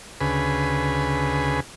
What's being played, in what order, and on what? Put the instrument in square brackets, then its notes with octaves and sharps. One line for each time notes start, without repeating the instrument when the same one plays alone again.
[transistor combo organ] D2 C#3 G#4 B4